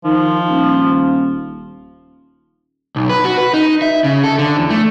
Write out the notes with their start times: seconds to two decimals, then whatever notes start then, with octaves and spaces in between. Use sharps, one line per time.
0.04 D#3 F3
0.49 D#1
2.96 B1
3.09 B4
3.25 F#4
3.38 B4
3.53 D#4
3.82 E5
4.04 C#3
4.24 A4
4.39 D3
4.57 E2
4.70 A3